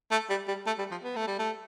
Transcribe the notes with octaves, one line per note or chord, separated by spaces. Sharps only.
A3
G3
G3
A3
G3
F3
B3
A3
G3
A3